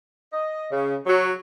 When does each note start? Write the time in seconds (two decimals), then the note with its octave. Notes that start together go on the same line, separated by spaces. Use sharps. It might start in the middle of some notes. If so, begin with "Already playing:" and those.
0.33 D#5
0.72 C#3
1.06 F#3